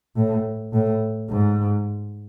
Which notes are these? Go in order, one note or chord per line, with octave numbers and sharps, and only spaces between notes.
A2
A2
G#2